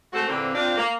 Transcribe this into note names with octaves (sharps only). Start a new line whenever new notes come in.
G#3 A3 C4 F#4 A4 C5
E2 A#2 D3 A#3 C4
C4 D4 F4
A#3